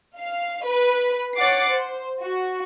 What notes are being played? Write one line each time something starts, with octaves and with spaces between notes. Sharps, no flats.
F5
B4
C#5 F#5 D6 A6 C7
C5
F#4